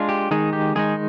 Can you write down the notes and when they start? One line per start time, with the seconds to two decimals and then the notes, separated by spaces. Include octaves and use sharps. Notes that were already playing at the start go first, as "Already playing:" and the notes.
Already playing: G#3 D4 F4
0.09 G4
0.31 D#3 G#3 D#4 G#4
0.53 G4
0.75 D#3 G#3 D#4 G#4